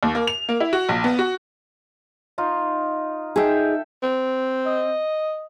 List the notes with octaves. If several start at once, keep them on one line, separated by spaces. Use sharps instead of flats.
D#2
A#3
F7
A#3
E4
F#4
A#1
B3
F#4
D#4 F4
D#4 G#4 A4 E5 G5
C4
D#5